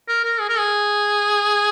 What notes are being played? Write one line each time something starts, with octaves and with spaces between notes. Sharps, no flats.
A#4
A#4
G#4
A#4
G#4